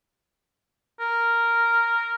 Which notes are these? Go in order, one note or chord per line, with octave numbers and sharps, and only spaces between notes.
A#4